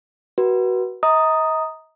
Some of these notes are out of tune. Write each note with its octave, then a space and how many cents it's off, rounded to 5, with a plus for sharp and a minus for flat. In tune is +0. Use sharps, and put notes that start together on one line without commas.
F#4 +15 B4 -30
D#5 +40 A#5 +0 D#6 +0